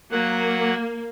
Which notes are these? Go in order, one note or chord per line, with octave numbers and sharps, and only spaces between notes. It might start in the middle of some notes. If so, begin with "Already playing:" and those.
F#3 A#3 F#5